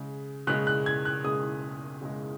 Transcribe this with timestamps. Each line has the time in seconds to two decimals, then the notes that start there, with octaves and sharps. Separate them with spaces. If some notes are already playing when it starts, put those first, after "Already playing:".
Already playing: C#3 G#3
0.47 C#3 G#3 F#6
0.67 F#6
0.86 G#6
1.05 F#6
1.24 C#3 G#3 D#6
2.02 C#3 G#3